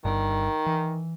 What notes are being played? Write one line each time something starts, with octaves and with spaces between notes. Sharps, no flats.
G1 G2 D#3
E3